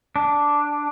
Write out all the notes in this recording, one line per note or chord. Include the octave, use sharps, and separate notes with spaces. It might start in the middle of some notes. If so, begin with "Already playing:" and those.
D4